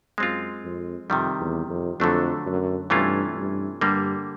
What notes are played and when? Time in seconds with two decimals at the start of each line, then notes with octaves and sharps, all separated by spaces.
0.18 F#2 G#3 C4 F4
0.64 F2
1.09 F2 C3 D#3 G3
1.40 E2
1.69 F2
2.00 F2 D3 F#3 A3 D4
2.46 F#2
2.90 G2 C3 E3 A3 C#4 F4
3.36 G2
3.81 G2 D3 G3 A#3